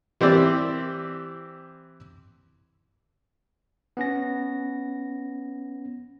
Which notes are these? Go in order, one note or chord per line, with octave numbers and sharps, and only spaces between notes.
E3 C4 G4 D5
B3 C#4 A#6